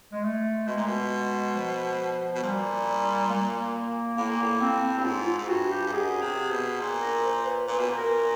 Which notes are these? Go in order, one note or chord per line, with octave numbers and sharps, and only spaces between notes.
G#3
A3
B2 G#3
A#2
B2
F3
B2
A#2 G3
A#3
A2 A#3
A#2
A2
C4
G2
G#2 F4
F4
G#2
G2 F#4
G4
G2
F#2 G#4
C3
B2
A#2
A#4
C5
B4
A#2 B4
B2
A#2
A#4